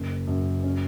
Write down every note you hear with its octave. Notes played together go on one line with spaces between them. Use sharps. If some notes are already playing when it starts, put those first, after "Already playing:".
Already playing: F#1
F#2
C#4